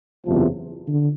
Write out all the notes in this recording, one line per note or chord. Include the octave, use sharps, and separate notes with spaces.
F#1 E2 C3 F3
D3